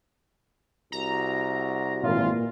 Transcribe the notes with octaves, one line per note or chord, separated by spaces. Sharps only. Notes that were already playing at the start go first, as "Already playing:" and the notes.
C2 F#4 A#5
G#1 A#2 E3 F4